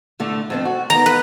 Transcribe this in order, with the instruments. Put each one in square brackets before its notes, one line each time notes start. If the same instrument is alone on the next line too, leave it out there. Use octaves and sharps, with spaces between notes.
[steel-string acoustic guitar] A2 D3 A3
F2 A3 C4
F#4
[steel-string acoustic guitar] D#3 B3 [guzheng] A#5
[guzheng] B4